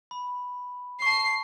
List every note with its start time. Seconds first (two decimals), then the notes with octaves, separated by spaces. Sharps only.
0.11 B5
1.02 A5 C#6 C7